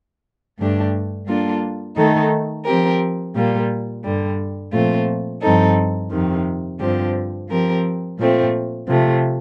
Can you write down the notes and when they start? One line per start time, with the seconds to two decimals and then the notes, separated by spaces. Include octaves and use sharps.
0.58 G2 D3 A3 D4 G4
1.27 G3 A#3 D4 F4 A4
1.97 D#3 A3 D#4 A4
2.66 F3 C4 G4 A#4
3.35 A#2 G3 A#3 F4
4.04 G2 D3 G3
4.73 A#2 F3 A3 C4 F4
5.42 G2 F3 C4 D#4 A4
6.11 F2 C3 D#3
6.80 G2 D3 F3 C4 G4
7.48 F3 C4 G4 A#4
8.18 A#2 F3 A3 C4
8.88 C3 F3 A3